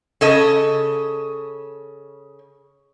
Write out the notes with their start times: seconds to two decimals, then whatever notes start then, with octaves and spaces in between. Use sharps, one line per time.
0.21 C#3 A4 D#5